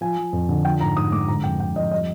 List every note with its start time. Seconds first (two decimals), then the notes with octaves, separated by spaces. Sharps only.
0.01 F3 G#5
0.18 F3
0.33 F2
0.49 D3
0.65 F3 G5
0.81 G#2 A#5
0.96 G#2 D#6
1.12 G#3 D6
1.28 D3 A#5
1.44 F2 G5
1.60 D3 G5
1.76 F2 D#5
1.91 G3 D#5